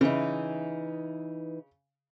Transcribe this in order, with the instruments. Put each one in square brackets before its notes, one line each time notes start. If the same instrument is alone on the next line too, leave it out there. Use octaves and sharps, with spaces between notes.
[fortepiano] C#3 [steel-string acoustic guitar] E3 D#4